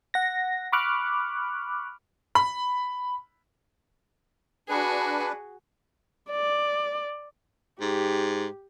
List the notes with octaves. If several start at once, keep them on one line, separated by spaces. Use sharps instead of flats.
F#5 A#6
B5 C#6 D6 F6 F#6
B5
D4 F#4 G#4 B4
D5
G#2 G4